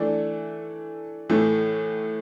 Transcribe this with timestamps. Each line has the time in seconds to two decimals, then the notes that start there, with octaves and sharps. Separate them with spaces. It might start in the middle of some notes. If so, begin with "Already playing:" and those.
Already playing: E3 A3 D4
1.29 A2 E3 A3